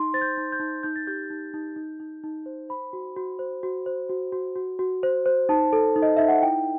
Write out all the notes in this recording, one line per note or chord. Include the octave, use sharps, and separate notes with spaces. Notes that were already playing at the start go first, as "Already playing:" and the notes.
Already playing: D#4 C6
C5 A6
G6
D#4
G6
D#4
D#4 G6
A6
G4 G6
D#4
D#4
D#4
D#4
D#4
C5
C5 B5
F#4
F#4
C5
F#4
C5
F#4
F#4
F#4
F#4
C5
C5
D#4 A5
A4
D#4
D#5
D#4 E5
F#5
E4 G5